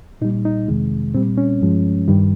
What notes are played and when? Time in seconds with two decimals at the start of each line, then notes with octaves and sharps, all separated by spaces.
0.21 A#2 D#4
0.25 G3
0.45 D#4
0.68 F2 C3 D#3 G#3
1.14 A#2 G3 C4
1.38 C#4
1.62 G2 F3 G#3
2.08 G2 D#3 G3